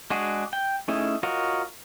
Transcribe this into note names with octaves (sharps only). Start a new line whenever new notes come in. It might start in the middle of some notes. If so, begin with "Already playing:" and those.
G#3 D4 F#4 G#4
G5
A3 C#4 D#4 E4 G#4
F4 F#4 A#4 C#5 D#5